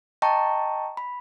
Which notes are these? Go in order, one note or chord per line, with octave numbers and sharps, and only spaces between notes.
D#5 G5 A5 A#5 C#6
B5